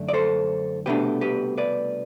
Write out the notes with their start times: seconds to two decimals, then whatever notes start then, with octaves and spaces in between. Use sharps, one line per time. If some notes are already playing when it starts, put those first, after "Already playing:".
Already playing: F#2 D3 A3 D4
0.09 D5
0.13 A4 C5
0.86 C2 B2 A3 D4 G4 B4
1.21 G4 B4
1.58 B4 D5